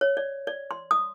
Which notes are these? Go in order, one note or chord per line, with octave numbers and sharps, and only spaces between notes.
C#5
D5
D5
C6
D#6